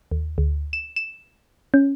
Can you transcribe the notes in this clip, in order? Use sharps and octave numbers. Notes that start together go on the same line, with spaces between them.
D#2
D2
E7
E7
C#4